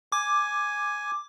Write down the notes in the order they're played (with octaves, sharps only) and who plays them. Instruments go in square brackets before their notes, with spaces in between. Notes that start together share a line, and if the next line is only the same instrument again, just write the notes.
[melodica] G#5 [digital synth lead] D6